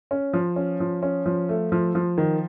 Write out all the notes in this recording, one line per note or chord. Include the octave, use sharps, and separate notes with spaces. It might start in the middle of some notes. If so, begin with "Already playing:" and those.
C#4
F3
C#4
F3
C#4
F3
A3
F3
F3
D#3